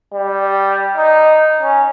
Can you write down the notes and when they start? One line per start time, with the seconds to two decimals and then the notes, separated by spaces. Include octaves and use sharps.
0.14 G3
0.96 D#4
1.61 C#4